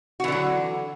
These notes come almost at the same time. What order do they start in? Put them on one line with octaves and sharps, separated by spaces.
F#4 E3 D3 F#3